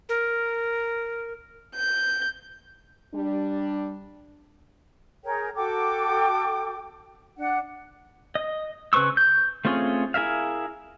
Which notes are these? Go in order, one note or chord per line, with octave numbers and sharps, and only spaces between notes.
A#4
G6
G3 D4
G#4 A#4 C#5 G5
F#4 A4 G5 D6
D4 F#5
D#5
C#3 B4 C5 C#6 E6
G6
A3 C4 C#4 F4 G#4
E4 G#4 A#4 E5 F5